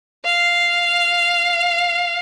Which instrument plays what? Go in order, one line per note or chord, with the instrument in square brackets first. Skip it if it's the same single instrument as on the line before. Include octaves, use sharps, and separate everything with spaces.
[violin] F5